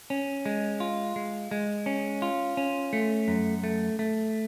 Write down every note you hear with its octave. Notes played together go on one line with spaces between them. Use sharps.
C#4
G#3
F4
G#3
G#3
C#4
F4
C#4
A3
F#2
A3
A3